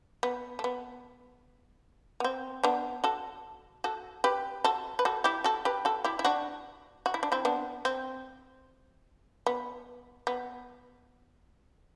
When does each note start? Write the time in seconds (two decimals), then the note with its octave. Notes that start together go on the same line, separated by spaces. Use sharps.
0.23 B3
0.59 A3
0.64 B3
2.20 B3
2.24 C4
2.63 B3 D4
3.04 F#4 A4
3.84 F#4 A4
4.24 G4 B4
4.64 F#4 A4
4.99 B4
5.05 F#4 A4
5.24 E4 G4
5.44 F#4 A4
5.65 G4 B4
5.85 F#4 A4
6.04 E4 G4
6.19 E4
6.25 D4 F#4
7.06 F#4
7.14 E4
7.23 D4
7.32 C4 E4
7.45 B3 D4
7.85 C4
9.46 B3
10.27 B3